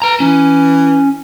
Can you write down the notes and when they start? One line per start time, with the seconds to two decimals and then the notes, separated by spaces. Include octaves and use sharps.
0.02 B4 A#5
0.20 E3 C#4